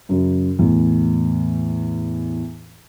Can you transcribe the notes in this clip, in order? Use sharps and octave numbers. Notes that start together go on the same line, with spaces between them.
F#2 C#3
E2 A2